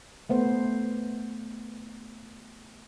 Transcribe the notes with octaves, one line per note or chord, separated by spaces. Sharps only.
A3 B3 C5